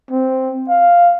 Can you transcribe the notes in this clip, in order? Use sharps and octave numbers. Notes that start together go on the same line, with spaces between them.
C4
F5